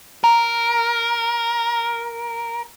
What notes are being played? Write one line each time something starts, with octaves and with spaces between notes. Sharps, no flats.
A#4 A#5